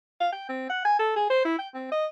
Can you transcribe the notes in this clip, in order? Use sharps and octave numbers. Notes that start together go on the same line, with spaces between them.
F5
G5
C4
F#5
G#5
A4
G#4
C5
E4
G5
C4
D#5